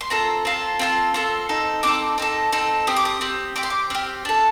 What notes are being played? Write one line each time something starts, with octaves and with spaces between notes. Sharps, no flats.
C6
C4 F4 A4 A#5
C4 F4 A4
C4 F4 A4
C4 F4 A4
C4 D#4 A4
C4 D#4 A4 D6
C4 D#4 A4
C4 D#4 A4
C4 G4 D#6
D6
D#6
C4 G4
C4 G4 D6
C6
D6
C4 G4 F6
D4 A4